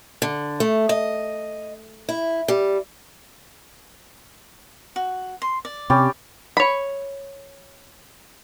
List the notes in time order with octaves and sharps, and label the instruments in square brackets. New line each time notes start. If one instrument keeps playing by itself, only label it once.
[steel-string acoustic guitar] D3
A3
D#5
E4
G3
[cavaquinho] F#4
C6
D5
[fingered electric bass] C3 [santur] C#4 G4 [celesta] B5 D6 A6
[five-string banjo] C#5 B5